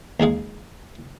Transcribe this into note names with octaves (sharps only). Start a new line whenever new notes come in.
D#2 G#3 G#4 F5